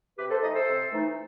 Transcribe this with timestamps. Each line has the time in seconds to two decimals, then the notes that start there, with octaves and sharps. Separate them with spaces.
0.18 C3 G4 B4
0.30 A4 C5
0.43 E3 A3 D#4 B4 D#5
0.55 A4 C5
0.68 C3
0.92 E3 A3 D#4